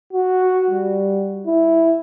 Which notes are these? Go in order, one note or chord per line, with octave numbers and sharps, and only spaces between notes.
F#4
G3
E4